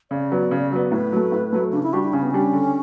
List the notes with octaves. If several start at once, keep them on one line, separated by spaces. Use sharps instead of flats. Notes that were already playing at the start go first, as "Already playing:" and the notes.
C#3 D5
F#3 B3
C#3
F#3 B3
A2 B4
F#3 A3
A2
F#3 A3
C#3 D4
E4
G3 D4 F#4 G4
E4
C#3 C#4
B3
G3 C#4 D4 G4
D3